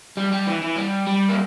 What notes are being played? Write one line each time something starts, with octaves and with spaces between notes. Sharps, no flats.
G3
G3
E3
E3
G3
G3
A#3